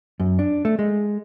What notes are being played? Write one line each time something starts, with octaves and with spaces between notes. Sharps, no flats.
F#2
D4
A3
G#3